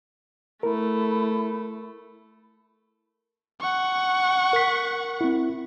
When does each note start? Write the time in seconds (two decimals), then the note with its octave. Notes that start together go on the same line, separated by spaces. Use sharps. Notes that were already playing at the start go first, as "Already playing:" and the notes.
0.63 A3 E4 A#4
3.61 F#5 C#6
4.53 A#4 B6
5.21 C4 E4